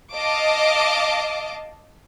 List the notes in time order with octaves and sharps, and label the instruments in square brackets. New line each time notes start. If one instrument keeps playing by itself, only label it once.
[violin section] D#5 F5 A5 D6